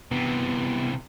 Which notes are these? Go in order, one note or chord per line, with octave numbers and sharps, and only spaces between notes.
C3 E3 B3